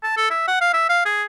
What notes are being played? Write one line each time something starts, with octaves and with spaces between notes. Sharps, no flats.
A5
A4
E5
F#5
F5
E5
F5
G#4